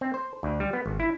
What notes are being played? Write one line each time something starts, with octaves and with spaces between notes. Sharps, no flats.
C4
C5
D2
G3
B3
G#1
E4